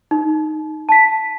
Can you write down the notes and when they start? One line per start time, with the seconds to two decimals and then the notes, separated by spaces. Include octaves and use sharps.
0.11 D#4
0.89 A5 B6